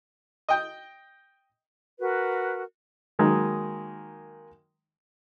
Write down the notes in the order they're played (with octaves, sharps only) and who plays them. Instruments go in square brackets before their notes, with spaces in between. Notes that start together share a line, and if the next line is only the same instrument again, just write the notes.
[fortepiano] D#5 G5
[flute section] F#4 A#4 B4
[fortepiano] D#3 F#3 G#3 A#3 D#4